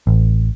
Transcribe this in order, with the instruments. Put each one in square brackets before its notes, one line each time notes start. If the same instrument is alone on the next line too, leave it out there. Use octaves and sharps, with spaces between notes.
[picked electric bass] A1